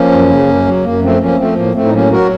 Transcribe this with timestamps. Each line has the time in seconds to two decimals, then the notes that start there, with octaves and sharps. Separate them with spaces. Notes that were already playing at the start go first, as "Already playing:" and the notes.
Already playing: F3 A#3 C#4
0.11 F#2
0.30 C#3
0.47 F#2
0.65 F#3
0.84 F#2 A#3
1.02 F3 A3 C4
1.20 F3 A#3 C#4
1.38 F3 A3 C4
1.56 A2 A#3
1.74 A2 A3 C4
1.85 D#4
1.93 F#3 A#3 C#4
2.11 F#3 F#4 A#4